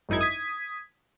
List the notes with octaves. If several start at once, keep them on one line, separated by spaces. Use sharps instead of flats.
G#1 F#2 D#4 E4 G#6
D#6 G#6 B6